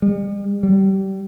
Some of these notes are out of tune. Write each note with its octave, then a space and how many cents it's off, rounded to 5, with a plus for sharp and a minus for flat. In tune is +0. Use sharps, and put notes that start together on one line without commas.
G3 +45
G3 -25